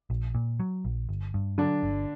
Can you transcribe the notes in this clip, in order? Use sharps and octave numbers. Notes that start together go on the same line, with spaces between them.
A#1
A#2
F#3
A#1
G1
G2
D3 F#3 D4
G1